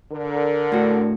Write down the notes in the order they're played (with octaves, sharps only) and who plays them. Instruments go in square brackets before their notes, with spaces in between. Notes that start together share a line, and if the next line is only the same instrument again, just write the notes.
[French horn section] D3 A#4
[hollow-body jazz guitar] A2 F#4